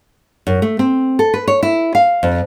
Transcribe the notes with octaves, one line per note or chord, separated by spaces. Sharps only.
F#2
A3
C4
A4
B4
C#5
E4
F5
F2